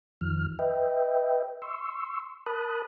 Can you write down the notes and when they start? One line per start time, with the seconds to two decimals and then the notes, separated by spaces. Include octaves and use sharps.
0.21 F2 D#3 F3 F6
0.59 B4 D#5 E5 G5
1.62 C6 C#6 E6
2.46 A#4 A5 B5 D#6 F#6